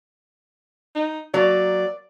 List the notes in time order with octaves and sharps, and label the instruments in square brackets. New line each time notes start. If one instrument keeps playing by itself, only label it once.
[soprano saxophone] D#4
[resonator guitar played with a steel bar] F#3 A#3 [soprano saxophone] D5